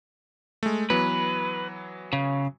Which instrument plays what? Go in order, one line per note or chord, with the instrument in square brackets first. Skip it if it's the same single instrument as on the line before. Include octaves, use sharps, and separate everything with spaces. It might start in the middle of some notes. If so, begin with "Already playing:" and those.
[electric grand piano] G#3 A3
[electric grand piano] E3 F#3 B3 [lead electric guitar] B4
[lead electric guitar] C#3